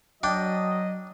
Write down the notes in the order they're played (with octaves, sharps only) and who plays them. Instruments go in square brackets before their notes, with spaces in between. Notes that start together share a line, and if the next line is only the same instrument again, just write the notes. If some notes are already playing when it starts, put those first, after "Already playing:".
[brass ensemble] F#3 D#5 [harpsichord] D4 G5